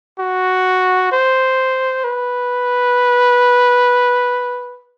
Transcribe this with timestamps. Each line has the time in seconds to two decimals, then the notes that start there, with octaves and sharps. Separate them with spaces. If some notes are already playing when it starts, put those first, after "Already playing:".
0.19 F#4
1.12 C5
2.04 B4